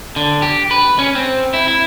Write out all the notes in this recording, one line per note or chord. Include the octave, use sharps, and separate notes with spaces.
D3
G4
B4
C#4
C4
E4
E4